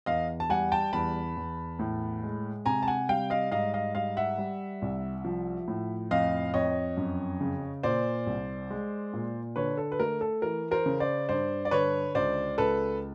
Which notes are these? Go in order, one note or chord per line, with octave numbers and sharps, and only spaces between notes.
E2 D#5 F5
A5
G3 F#5 G#5
G5 A5
E2 A5 B5
E2
A2
G#3
C3 G#5 A#5
A5
F#5 G#5
G3 F5 G5
D#5 F5
G#2 D#5 F5
D#5 F5
G3 D#5 F5
E5 F#5
G3
C2
F3
A2
F2 D#5 F5
F2 C#5 D#5
F#2
C#3
A#2 C5 D5
C2
G#3
A#2
D3 B4 C#5
A4
B4
A3 A#4
A4
E3 A#4
A#4 C5
C#3
C5 D5
G2 C5 D5
D5
D3 B4 C#5
C#2 C5 D5
C#2 A4 B4